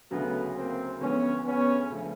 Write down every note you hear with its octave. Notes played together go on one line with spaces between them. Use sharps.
D2 C#3 F#3 A3 B3
A#3 C4
D2 D3 F3 G#3 B3 C#4
B3 C#4
D2 C#3 F3 A3 C#4